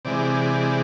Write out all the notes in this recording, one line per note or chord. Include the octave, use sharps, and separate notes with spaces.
C3 E3 G#3 D5